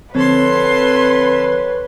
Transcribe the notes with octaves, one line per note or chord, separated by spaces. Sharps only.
D3 F3 C4 A4 B4 C#5 C6